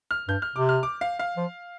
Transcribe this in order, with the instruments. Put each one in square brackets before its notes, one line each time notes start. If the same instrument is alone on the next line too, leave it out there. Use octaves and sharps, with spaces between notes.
[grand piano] F6
[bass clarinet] G2 [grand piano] G6
[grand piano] F6
[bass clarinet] C3 [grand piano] D6
[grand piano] F6
D6
F5
F5
[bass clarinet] F3